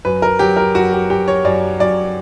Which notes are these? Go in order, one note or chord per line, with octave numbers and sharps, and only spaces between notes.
F#2 B4
A#4
F#3 G4
A#4
F#2 F#4
G4
F#2 G4
C#5
F#2 D5
F#2 D5